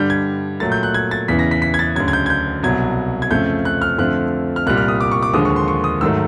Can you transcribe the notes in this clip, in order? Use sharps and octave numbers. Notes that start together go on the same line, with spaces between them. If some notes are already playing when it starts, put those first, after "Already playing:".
Already playing: G2 D3 G3 G6
G#6
A#2 F#3 A3 A6
G6
F#6
G#6
A6
E2 C#3 E3 B6
A#6
B6
B6
G#6
A6
D2 C#3 F#3 G#6
G#6
G6
G#6
G6
C2 B2 F#3 G#6
G#6
F2 C#3 F3 A3 G6
F#6
F6
F2 D3 F3 A3 F#6
F6
C2 A#2 G3 F#6
F6
D#6
D6
C#6
D6
D#2 D3 F3 G#3 D#6
C#6
C6
C#6
D#6
G#2 D#3 F#3 A3 E6